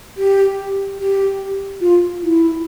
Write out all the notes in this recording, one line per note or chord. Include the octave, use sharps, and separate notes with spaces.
G4
G4
F4
E4